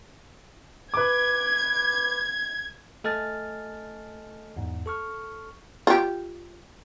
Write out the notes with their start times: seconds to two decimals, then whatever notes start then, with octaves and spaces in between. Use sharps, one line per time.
0.94 B4 D6 G#6
3.04 A3 A4 D#5 G#5 F6 A6
4.57 E2 G#2
4.86 A4 C#6 F6
5.87 F4 G4